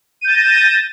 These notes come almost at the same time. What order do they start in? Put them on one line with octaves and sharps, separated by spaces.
D#7 G6 A6 E7 A#6